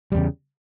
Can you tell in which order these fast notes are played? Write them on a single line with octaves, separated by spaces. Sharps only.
G3 E2 C#3